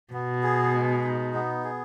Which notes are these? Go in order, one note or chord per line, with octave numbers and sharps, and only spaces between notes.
B2 B3
G#4
G#3
D#4
B3
G#4